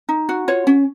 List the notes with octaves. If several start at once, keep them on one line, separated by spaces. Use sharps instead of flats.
D#4
F#4
F4 C#5
C#4